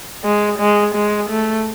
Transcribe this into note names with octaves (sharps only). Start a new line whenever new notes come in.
G#3
G#3
G#3
A3